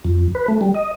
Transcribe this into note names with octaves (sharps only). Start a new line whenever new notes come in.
F2
B4
A3
G3
D#5